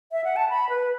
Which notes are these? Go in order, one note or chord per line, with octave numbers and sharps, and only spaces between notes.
E5
F#5
A5
B5
B4